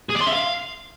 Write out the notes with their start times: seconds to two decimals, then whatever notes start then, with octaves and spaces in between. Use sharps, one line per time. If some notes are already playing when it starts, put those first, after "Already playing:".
0.10 G#4
0.16 D5
0.22 C6
0.27 E5
0.33 F5